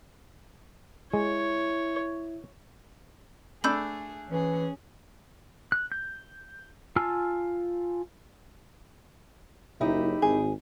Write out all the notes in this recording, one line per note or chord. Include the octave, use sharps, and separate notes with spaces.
G#3 E4 C#5
A3 D4 G#4 B5 E6 G6
E3 C#4 G#4
F#6
G6
F4 G#5 A5 E6 F6
F#1 D#4 E4 G4
G#1 G#4